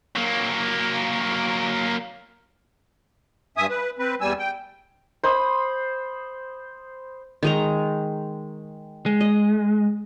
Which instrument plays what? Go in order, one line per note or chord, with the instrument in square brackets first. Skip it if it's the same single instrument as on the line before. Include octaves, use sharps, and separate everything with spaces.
[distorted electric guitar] F#3 A#3
[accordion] G2 E5 G#5 D#6
B4
C4 B4
E2 G3 G#5 E6
G5
[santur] C5 B5 D#6
[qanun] D#3 G#3 A#5
[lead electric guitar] G#3
[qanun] D#5